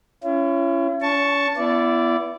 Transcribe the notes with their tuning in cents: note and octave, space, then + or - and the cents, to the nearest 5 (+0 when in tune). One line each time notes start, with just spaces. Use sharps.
C#4 +0 E4 +45
C#4 +40 A5 +0 C#6 +0
B3 +0 E4 +30 D5 -10